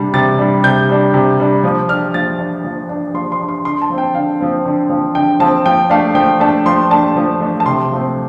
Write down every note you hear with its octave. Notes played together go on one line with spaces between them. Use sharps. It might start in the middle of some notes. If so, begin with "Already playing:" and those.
Already playing: C3 G3 D4
C3 A6
G3 D4
C3 G6
G3 D4
C3
G3 D4
F3
D4 F6
F3 A6
D4
F3
D4
F3 C6
C6
D4
C6
D3 C6
A5
F3 C4
G5
D3 F5
F3 C4
D3
F3 C4
D3 G5
F3 C4 A5
F3 G5
A3 D4 F5
F3 G5
A3 D4 A5
F3 C6
A3 D4 A5
F3
A3 D4
A5
C3 C6
F3 A3 C4